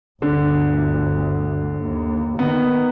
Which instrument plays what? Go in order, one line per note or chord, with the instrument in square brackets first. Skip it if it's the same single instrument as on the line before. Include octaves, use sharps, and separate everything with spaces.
[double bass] G1 D2 [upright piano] D3
[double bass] D#2
[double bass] D#3 [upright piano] B3